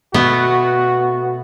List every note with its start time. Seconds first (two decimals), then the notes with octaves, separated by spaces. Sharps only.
0.14 B2 A3 B3 F#4